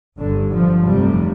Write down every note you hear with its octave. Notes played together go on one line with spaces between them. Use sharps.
G1 G2 D3
F3
F1 F2 C3 G3